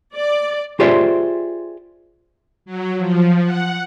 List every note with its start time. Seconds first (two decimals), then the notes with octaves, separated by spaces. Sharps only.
0.16 D5
0.80 F4 G4 G#4 C5 D5 E5
2.66 F#3
2.98 F3
3.44 F#5